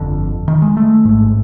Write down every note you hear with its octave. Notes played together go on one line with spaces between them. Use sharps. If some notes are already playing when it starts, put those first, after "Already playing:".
Already playing: G1 F2 D3
D#3
G#3
A3
A1 G#2